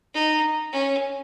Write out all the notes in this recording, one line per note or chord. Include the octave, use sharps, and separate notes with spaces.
D#4
C#4